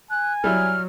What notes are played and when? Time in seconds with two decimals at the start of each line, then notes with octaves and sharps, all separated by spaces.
0.11 G#5 F#6
0.44 F#3 G3 E4 F6